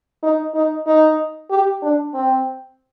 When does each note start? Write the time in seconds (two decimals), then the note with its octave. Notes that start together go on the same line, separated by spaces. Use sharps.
0.23 D#4
0.54 D#4
0.87 D#4
1.50 G4
1.82 D4
2.14 C4